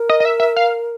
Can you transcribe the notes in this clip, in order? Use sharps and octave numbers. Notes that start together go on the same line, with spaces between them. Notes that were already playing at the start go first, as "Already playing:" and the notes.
Already playing: A#4
D#5
D#5
E5
E5
F5